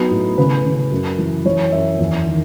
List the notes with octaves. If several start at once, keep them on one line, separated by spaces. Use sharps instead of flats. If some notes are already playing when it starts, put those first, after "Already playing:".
Already playing: F#3 B3 D#4
A2
C#3 B4
C#3
F#2
E3
E3 C#5
F#2 E5
E2
D#3